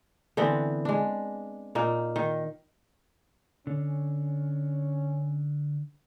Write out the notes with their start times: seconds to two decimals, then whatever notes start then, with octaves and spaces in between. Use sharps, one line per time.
0.37 D3 E3 B3 C4
0.85 G#3 D4
1.75 A#2 A#3 D#4
2.16 D#3
3.67 D3 C#4